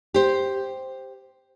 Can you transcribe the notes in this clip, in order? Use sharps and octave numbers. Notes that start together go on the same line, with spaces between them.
G4 C5